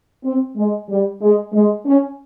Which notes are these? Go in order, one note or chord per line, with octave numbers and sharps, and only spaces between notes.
C4
G#3
G3
G#3
G#3
C#4